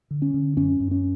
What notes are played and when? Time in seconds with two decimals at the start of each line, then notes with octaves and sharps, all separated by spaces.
0.11 D3
0.22 C#4
0.34 D3
0.57 F#2 C#4
0.80 F#2
0.91 C#4